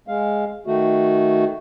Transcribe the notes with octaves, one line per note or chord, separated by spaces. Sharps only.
G#3 F5
D#3 A3 F#4